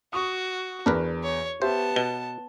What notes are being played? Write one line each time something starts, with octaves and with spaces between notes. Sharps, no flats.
F#4 C#6 D#6
E2 D4 A#4 B4
C#5
B3 G4 C5 E5 A5
B2 G7